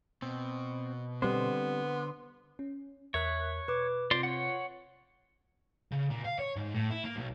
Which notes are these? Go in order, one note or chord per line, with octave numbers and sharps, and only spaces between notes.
B2 C4
D3 G3 B3 C4 C5
C#4
E2 A#4 C#5 E5 F#6
B2 B4 D6
C3 C4 F4 D5 C6
C#5 F#5
C#3
A#2
F5
C#5
G#2
A2
E4
A#3
B1